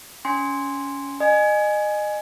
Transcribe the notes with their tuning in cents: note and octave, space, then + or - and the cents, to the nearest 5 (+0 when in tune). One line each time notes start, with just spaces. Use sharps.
C#4 +20 G#5 -15 C6 +0
D#5 -30 G#5 +0